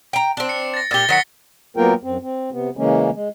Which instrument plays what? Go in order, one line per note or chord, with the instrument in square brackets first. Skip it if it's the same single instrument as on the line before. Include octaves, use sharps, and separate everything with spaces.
[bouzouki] G5 A#5
C4 D4
[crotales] C#7
A6 A#6
[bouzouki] A#2 G4 [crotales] F6 A6 G7
[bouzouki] D#3 F#3 [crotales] A#6 B6 C#7
[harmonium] F#3 A#3 B3 F4 A#4 G5
F#2 C4
C4
C3 B3
C#3 E3 G#3 A#3 C#4
G#3